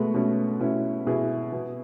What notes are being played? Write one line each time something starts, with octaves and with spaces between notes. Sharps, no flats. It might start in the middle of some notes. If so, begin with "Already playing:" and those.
Already playing: B2 G#3 A3 B3
B2 A3 C#4
B2 C#4 E4
B2 E4 G#4
B2